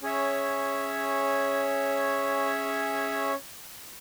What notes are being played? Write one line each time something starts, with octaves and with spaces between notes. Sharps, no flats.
C#4 G#4 C#5 E5